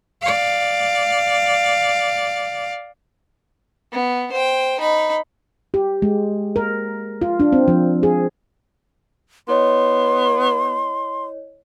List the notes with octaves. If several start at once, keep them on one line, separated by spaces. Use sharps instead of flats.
D5 F5
B3
C5 G5
D#4 B5
G4
G#3
A#4
F4
D4
C4
F3
G#4
B3 E4 C#5 D#5 C6